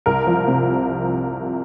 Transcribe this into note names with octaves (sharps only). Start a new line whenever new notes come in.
C2 A#4
F3
C3